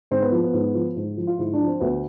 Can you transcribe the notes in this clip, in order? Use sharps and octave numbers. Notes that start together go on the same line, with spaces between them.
G#2 C4
B3
F3
B3
G#2
F3
G#2
F3
F4
G#2 E4
D4
F3
C4
D2 B3